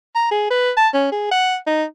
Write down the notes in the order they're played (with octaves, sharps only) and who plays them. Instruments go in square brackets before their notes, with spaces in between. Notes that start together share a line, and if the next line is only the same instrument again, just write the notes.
[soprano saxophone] A#5
G#4
B4
A5
C#4
G#4
F#5
D#4